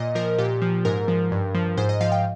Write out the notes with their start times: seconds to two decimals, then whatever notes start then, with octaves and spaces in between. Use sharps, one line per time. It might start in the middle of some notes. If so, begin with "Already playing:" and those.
Already playing: A#2 D#5
0.15 F3 A#4
0.38 A#2 G4
0.62 F3
0.85 G#2 A#4
1.08 F3
1.31 G2
1.55 F3
1.77 G#2 C5
1.89 D#5
2.01 F3 F5
2.12 G5